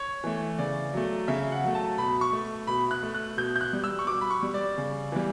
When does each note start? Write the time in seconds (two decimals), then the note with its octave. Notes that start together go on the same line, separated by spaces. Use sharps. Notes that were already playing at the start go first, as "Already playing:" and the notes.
Already playing: C#5
0.24 E3 A3
0.58 C#3 D5
0.93 F#3 A3
1.28 C#3 E5
1.52 F#5
1.64 F#3 A3
1.75 A5
1.98 B2 B5
2.21 C#6
2.33 A3
2.67 B2 B5
2.91 F#6
3.03 A3
3.14 F#6
3.37 B2 G6
3.56 G6
3.61 F#6
3.73 G3
3.84 E6
3.99 C#6
4.07 B2 D6
4.21 B5
4.30 C#6
4.43 G3
4.54 D5
4.78 C#3
5.12 E3 G3